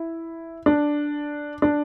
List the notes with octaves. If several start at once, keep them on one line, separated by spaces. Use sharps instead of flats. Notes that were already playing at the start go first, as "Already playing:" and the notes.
Already playing: E4
D4
D4